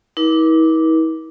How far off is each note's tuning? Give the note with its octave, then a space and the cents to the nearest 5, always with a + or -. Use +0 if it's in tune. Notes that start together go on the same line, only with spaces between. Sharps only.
E4 -45 A#4 +45 D6 -5